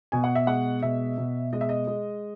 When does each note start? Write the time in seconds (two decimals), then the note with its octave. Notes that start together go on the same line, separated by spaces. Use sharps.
0.12 B2 G#5
0.24 F#5
0.35 E5
0.47 G#3 F#5
0.82 B2 E5
1.18 B2
1.53 G#3 D#5
1.61 E5
1.69 D#5
1.87 G#3